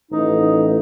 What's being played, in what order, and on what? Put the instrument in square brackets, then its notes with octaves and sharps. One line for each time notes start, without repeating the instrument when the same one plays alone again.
[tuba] A1 [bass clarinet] D#4